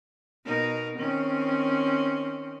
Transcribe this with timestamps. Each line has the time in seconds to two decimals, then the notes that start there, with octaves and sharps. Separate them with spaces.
0.45 B2 D#4 A#4
0.98 D#3 C4 C#4